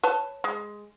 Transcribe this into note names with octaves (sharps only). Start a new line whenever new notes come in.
B4 C#5 A5
G#3